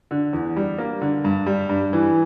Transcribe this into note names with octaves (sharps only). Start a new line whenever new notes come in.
D3
E2
G3
A#3
D3
G2
G3
G2
E3